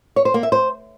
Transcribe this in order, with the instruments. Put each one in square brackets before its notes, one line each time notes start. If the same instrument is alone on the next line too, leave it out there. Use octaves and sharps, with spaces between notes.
[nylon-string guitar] C#5
C5
A#3
E5
C5